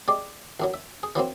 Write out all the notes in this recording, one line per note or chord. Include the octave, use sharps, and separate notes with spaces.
G#3 G4 D5
A1 F#2 F#3
E5
G#4
E3 F#3 A#3 C4